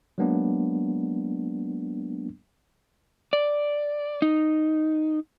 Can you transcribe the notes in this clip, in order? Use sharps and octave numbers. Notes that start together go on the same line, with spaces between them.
F#3 G#3 A#3 B3 D4
D5
D#4